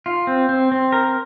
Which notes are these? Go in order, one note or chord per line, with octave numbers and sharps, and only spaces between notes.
F4
C4
C4
C4
A#4